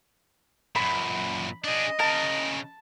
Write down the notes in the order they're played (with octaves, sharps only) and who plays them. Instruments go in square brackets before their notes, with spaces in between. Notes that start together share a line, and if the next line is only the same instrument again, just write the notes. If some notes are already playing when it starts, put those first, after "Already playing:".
[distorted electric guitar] F#2 A#2 [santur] B5
[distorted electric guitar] D4 G#4 [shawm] D#5
[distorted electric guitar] C#3 A#4 [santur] A5